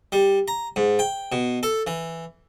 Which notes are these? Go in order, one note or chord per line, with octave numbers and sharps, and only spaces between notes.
G3
A#5
G#2
G5
B2
A4
E3